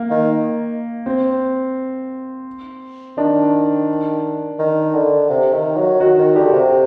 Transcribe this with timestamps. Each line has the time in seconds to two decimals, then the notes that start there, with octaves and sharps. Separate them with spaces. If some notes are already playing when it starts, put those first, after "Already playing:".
Already playing: A#3
0.11 D#3
1.06 C4
3.18 D#3 D4
4.59 D#3
4.94 D3
5.30 C3
5.53 D#3
5.77 F#3
6.00 D#3 F#4
6.18 D#3
6.36 D3 G4
6.53 C3